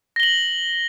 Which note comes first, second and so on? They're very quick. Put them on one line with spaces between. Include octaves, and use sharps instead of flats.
A#6 G7 F#7